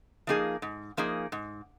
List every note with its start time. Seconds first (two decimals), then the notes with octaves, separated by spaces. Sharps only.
0.27 F3 A#3 D#4 G#4
0.62 G#2
0.97 F3 A#3 D#4 G#4
1.32 G#2